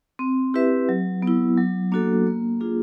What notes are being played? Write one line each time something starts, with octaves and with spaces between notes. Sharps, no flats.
C4
E4 G4 B4 E5
F#3
B3
E4
F#3
A#3 D4 F#4 A4
A#3
D4 F4 G#4